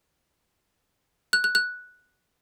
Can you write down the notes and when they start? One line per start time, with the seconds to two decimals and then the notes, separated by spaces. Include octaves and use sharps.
1.33 F#6
1.44 F#6
1.55 F#6